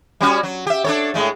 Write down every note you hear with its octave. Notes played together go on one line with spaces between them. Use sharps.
G3 C#4 F#4
F#3
G4 E5
D4 A4 C#5
A2 G#3 A3